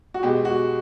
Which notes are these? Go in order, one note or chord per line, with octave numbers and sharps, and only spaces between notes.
F#4
B2 G#3 G4
F#4